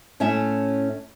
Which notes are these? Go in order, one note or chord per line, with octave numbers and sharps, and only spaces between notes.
A2 C#4 E4 E5